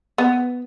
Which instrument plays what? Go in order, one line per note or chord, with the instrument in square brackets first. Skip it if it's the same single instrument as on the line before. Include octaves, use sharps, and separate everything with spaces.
[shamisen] B3